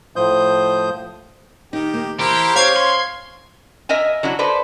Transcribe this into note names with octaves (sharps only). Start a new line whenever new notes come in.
A2 F3 C5 D#6 G6
D#3 D#4 G4
A#3
E3 E4 G4 A#4 C5
C#4 C5 C#5 F5 G#6 C7
C6
A#4 D#5 E5 G#5
F#3 D4 E4 F#4
A4 B4 C5 D5